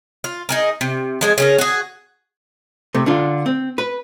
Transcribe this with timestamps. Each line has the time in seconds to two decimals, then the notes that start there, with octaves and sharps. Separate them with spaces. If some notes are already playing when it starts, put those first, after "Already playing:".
0.24 F4
0.49 D#4 G#4 A#4
0.81 C3
1.21 F3 G#3 G#5
1.38 C#3 C#4 A#4
1.58 F#4 G#4
2.94 C3 A3
3.06 D3 D4 F4
3.46 C4
3.78 B4